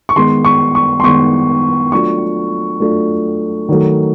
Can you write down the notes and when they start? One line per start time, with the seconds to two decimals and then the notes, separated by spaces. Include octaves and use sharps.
0.09 C#6
0.16 D#3 G#3 B3 C6
0.45 C#6
0.75 C#6
1.00 C6
1.03 D#3 G#3 B3 C#6
1.92 F#3 A3 D4 F4 C#6
2.80 F#3 A3 D4 F4
3.69 D#3 F#3 A3